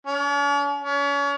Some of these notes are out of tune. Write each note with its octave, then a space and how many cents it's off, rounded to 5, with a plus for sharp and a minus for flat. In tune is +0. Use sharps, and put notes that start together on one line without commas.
C#4 +45
C#4 +35